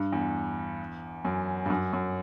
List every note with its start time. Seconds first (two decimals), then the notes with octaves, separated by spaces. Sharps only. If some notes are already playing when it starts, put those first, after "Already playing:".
Already playing: G2
0.12 E2
1.25 F#2
1.66 G2
1.70 F#2
1.93 F#2